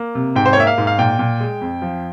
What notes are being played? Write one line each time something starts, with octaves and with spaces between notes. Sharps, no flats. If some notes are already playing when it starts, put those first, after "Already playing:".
Already playing: A#3
C3
G#2 G5
C5
C#5
A#3 E5
F5
G#2
F5
A#2 G5
A#2
G#3
F2
F3